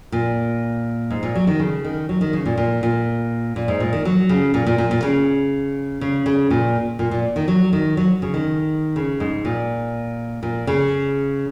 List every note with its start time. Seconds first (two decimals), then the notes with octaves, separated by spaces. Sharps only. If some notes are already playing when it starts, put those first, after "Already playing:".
0.12 A#2
1.10 G#2
1.23 A#2
1.35 F#3
1.47 D#3
1.59 C#3
1.85 D#3
2.09 F#3
2.21 D#3
2.33 C#3
2.46 A#2
2.58 A#2
2.83 A#2
3.56 A#2
3.68 G#2
3.80 A#2
3.93 D#3
4.05 F#3
4.29 C#3
4.54 A#2
4.66 A#2
4.78 A#2
4.91 A#2
5.03 C#3
6.01 C#3
6.26 C#3
6.50 A#2
6.99 A#2
7.11 A#2
7.36 D#3
7.48 F#3
7.73 D#3
7.97 F#3
8.22 C#3
8.34 D#3
8.96 C#3
9.20 G#2
9.45 A#2
10.43 A#2
10.67 C#3